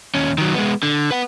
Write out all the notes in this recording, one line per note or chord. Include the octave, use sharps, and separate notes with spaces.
D#2 C#4
D#3 F#3
G#3 B3
D3
B4 F#5